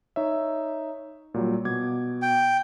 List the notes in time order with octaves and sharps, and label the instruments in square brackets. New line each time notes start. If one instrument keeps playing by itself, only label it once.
[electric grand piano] D#4 C#5 E5
A#2 F#3 G3
B2 D6 G#6
[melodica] G5